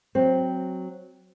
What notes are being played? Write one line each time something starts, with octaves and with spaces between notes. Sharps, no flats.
F#3 C4